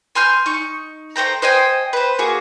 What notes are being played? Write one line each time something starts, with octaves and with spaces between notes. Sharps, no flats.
G#5 C6 F6 G6
D#4 C#6
A3 C5 G5 A#5
C5 D#5 G5 G#5
B4 C5
A#3 F#4 G#4